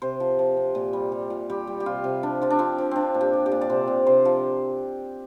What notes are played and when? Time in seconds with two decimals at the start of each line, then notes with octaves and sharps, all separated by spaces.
0.02 C3 C5
0.20 F3
0.39 F3
0.57 C3
0.75 A#2
0.93 G3
1.12 G3
1.30 A#2
1.50 G3 G4
1.67 G3
1.80 G4
1.86 C3 F4
2.04 C3
2.23 F3 D4
2.42 F3 F4
2.50 D4
2.59 F3 C4
2.78 F3
2.91 F3 C4 D4
3.14 A#2
3.21 G4
3.33 F3
3.46 G4
3.52 A#2
3.61 D5
3.70 C3 C5
3.87 C3
4.06 C3 C5
4.25 F3